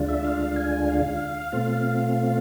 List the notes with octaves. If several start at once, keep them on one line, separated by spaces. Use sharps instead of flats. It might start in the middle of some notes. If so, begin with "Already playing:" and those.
Already playing: D2 D3 G#3 D4 F4
E5
F5
G#5
F5
B2 A3 C4 F4